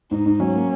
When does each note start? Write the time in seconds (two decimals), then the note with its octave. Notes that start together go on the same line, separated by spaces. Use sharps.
0.11 G#2 D#4
0.26 G#2
0.40 F#3 C#4
0.55 A#3